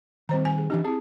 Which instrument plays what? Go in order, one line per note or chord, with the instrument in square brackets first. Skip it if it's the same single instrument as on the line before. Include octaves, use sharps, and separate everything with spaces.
[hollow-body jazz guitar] D#3 G3 [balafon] C4 C5 A#5
[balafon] G#5
G#4
[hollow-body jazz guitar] E3 D4 D#4 [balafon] G4
[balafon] C4 E4 [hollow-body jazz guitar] G#4 A5